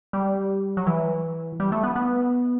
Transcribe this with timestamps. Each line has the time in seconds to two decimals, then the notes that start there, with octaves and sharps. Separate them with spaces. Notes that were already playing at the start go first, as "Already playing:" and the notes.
0.13 G3
0.77 F#3
0.87 E3
1.60 G3
1.72 A3
1.83 B3
1.96 B3